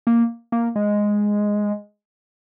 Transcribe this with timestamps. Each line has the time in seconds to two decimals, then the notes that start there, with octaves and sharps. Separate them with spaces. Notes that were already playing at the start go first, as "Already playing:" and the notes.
0.07 A#3
0.52 A#3
0.76 G#3